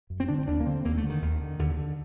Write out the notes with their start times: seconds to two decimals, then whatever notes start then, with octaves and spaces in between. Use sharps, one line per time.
0.10 F#2
0.20 C4
0.28 D3 D4
0.38 C4
0.47 D#2 D4
0.60 A#3
0.66 D3 C4
0.85 D#2 A#3
0.97 A3
1.03 D3
1.09 D#3
1.22 D#2
1.41 D3
1.59 D#2 D3
1.77 D3